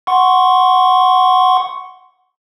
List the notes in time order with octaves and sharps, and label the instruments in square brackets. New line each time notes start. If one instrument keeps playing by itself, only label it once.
[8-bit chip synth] F#5 C6 C#6